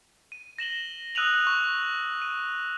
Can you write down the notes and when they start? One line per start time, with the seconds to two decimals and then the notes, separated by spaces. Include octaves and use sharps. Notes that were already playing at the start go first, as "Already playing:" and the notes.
0.32 D#7
0.58 A#6 E7 F#7 G7
1.15 D#6 E6 F#6 D#7 F7 F#7
1.47 C#6
2.22 D#7